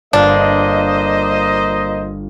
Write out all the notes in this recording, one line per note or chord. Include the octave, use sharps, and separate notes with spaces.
G1 A#3 D4 F4 C5 D#5 F6